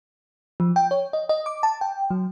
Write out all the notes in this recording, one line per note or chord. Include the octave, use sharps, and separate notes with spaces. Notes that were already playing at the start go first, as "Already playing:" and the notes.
F3
G5
C#5
D#5
D#5
D6
A5
G5
F#3